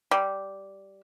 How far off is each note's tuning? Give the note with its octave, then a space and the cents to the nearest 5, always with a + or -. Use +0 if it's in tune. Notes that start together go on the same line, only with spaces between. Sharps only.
G3 -10